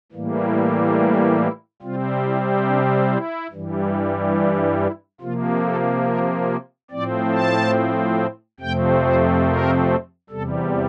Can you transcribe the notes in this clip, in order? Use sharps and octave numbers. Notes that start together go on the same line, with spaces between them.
A2 E3 G3 A#3
E4
E4
C3 G3 C4 F4
E4
D4
E4
G2 E3 G3
D4
E4
C3 F3 A#3 F4
A4
A#4
A2 F3 C4 D5
A5
F2 C3 F3 A3 C4 G5
C5
A#4
E2 C3 G3 A4